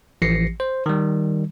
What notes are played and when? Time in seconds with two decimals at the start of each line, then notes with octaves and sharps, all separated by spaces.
0.22 A1 E3 F3 A#6 C7 C#7
0.60 C5
0.86 D#3 G3